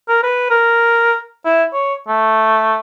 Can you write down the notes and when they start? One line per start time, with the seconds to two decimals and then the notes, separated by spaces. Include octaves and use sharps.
0.09 A#4
0.23 B4
0.50 A#4
1.45 E4
1.73 C#5
2.08 A3